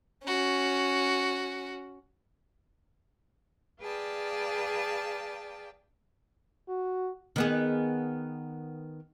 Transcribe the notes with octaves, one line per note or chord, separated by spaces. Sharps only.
C#4 F#4
G#4 B4 D5 F5 G5 A5
F#4
D#3 B3 G#4